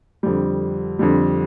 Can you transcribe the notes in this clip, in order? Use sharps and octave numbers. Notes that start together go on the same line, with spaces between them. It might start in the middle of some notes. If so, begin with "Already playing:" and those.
F2 D3 G3
F2 D3 G3